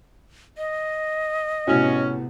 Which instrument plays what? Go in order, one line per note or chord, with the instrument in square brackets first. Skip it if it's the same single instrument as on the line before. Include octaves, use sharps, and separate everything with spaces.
[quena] D#5
[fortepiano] A2 F#4 [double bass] C3 B3 [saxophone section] C#4